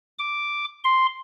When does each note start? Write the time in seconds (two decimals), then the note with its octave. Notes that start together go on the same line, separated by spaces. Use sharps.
0.19 D6
0.84 C6